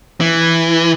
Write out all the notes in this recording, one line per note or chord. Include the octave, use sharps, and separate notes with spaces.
E3